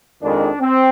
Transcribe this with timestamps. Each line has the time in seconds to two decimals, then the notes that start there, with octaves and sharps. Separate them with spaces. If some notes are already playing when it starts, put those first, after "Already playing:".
0.22 F2 D#3 G#3 D4
0.61 C4